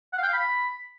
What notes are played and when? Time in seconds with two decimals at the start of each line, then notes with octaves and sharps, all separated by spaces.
0.13 F#5
0.18 F5
0.23 G5
0.28 F5
0.33 B5